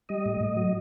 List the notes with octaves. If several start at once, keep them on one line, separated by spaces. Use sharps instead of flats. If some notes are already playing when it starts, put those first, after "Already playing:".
G3 D#5
A2
A2
F#3